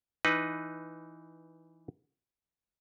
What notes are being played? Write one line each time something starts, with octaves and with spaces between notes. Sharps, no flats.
E3 D#4 B4